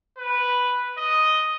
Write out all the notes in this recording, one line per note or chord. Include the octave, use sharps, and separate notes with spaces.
B4
D#5